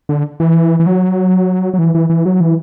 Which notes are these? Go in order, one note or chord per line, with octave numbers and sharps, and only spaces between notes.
D3
E3
E3
F#3
F#3
E3
E3
E3
F#3
E3